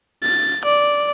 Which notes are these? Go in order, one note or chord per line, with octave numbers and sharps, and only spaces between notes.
A6
D5